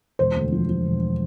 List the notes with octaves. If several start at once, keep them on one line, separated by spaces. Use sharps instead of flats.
E1 C5
D2
F3
F3
E1